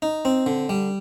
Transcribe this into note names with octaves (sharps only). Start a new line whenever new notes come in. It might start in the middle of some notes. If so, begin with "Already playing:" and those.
D#4
C4
D3
G3